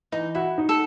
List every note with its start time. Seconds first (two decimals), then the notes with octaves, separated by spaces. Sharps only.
0.12 E3 D#4
0.35 E4 F#4
0.58 D#4
0.69 A4